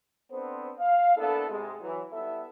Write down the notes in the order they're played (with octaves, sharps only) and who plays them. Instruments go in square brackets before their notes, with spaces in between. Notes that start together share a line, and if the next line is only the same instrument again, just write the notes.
[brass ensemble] B3 C4 D4 A4 C5
F5
A#3 B3 D4 E4 A4
G#2 C3 G#3
E3 F#3
G3 B3 E4 A4 E5